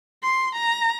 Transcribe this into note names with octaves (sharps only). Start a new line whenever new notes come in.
C6
A#5